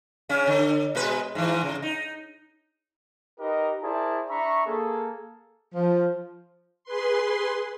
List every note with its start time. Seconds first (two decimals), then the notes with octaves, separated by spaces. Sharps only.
0.29 C#3 C#4
0.47 D3
0.95 B2 G#3 B4
1.35 G#2 E3
1.63 C#3
1.82 D#4
3.39 D#4 G4 A#4 B4 D#5
3.82 E4 G#4 A#4 C5 D5 A5
4.29 D4 E5 A#5 B5 C#6
4.66 A#3 G#4 A4
5.75 F3
6.84 G#4 B4 C6